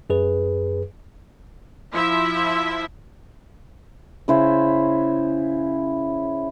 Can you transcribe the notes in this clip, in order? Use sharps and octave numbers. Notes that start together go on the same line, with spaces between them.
F#2 G#4 B4
F3 E4 E5
C#3 E4 C5